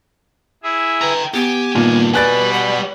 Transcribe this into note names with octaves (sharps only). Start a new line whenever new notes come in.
E4 G#4 E5
B4 G5 A#5
B3 G4 G#5
G2 A#2 D#3
B2 G3 B4 D5 G#5 B5 F#6 A6
F#5